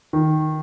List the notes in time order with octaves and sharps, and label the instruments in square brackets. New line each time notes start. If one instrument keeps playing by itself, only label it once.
[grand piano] D#3